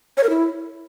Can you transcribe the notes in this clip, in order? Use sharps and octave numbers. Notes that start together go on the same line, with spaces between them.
C#5
A#4
E4